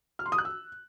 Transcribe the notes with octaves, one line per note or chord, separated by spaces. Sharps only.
F6
C6
D#6
F#6
E6